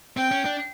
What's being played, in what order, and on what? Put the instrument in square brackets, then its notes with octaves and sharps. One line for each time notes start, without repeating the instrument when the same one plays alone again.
[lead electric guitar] C4 [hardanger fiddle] G5
[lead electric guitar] C#4
D4